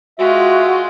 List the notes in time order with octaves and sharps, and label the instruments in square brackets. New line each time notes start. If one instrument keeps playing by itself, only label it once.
[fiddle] G#3 F4 [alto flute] F#4 [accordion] E5